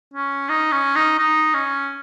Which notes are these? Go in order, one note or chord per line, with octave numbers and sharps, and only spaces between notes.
C#4
D#4
C#4
D#4
D#4
C#4